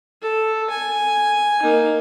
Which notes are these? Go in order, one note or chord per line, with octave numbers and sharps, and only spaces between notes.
A4
G#5
A#3 D#4